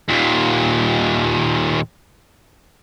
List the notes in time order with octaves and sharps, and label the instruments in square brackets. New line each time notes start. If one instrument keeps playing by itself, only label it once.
[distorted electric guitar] D#2 A#2